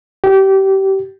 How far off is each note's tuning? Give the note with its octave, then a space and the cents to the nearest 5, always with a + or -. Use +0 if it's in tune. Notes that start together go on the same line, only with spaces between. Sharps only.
G4 -25